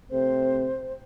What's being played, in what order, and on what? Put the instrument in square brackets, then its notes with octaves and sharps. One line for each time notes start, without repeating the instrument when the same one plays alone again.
[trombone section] C3 A3 C4 [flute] C5